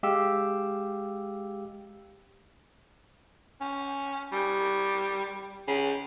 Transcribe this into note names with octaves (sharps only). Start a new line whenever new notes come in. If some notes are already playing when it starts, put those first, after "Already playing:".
G#3 G4 F5 E6
C#4
G3
C#3